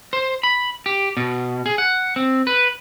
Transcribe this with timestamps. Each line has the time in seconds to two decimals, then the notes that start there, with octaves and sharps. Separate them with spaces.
0.13 C5
0.43 B5
0.86 G4
1.17 B2
1.66 G#4
1.78 F#5
2.16 C4
2.47 B4